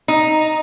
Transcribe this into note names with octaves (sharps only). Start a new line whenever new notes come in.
D#4